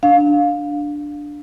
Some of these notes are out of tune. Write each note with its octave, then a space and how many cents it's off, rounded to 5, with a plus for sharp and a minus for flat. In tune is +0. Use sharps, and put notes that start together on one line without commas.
D4 +0 F5 +15